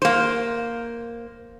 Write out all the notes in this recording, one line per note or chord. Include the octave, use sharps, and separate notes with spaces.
A#3 C5